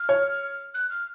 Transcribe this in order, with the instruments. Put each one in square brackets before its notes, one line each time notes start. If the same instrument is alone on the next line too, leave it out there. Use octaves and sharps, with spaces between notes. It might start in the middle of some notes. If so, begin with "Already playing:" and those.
Already playing: [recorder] F6
[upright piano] C#5
[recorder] F#6
F6